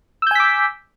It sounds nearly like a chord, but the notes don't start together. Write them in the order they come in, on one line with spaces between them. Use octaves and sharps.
E6 G6 G#5 B6 D6